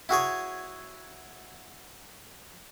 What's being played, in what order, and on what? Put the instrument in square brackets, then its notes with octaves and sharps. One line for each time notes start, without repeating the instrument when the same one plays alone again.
[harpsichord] E4 F#4 G#4 C#5